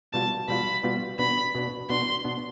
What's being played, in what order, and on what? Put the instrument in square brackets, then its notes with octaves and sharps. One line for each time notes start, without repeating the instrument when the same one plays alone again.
[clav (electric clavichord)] B2 G3 B3 F4 [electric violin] A5
[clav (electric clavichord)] B2 G3 B3 F4 [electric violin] B5
[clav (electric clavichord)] B2 G3 B3 F4
[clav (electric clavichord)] B2 B3 D4 [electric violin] B5
[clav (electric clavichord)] B2 B3 D4
[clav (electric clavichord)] B2 B3 D4 [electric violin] C6
[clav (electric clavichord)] B2 B3 D4